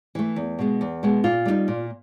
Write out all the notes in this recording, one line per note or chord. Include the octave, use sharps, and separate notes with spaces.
E3 A3
E2
B2 G#3 B3
E2
B2 G#3 B3
A#2 F4
G3 B3 D#4
A#2